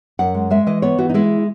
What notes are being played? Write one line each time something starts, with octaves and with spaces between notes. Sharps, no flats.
F#2 F#5
G#3
G#3 E5
E3 D#5
B3 C#5
E3 F#4
D#4
G#3 E4